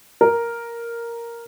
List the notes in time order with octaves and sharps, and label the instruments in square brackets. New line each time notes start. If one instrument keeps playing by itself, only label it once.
[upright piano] A#4